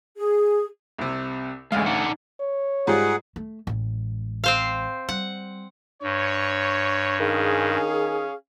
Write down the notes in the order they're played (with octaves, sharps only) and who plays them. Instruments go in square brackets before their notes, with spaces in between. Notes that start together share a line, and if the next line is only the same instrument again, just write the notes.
[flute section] G#4
[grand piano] C2 C3
[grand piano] A1 D2 F5 [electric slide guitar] G#3
[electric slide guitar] D4 D#4 F#5
[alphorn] C#5
[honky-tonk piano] G#2 G3 F4 [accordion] G#4 F#5
[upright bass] A3
A1 G#3
[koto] C4 C5 F5
[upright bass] G3 [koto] F#5
[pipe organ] G2 [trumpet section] C#5
[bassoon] D#3 [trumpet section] C#4 F5 [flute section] G#4